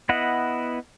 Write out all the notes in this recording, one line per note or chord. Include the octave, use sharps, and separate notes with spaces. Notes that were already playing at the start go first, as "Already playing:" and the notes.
B3 E4 D#5 F#5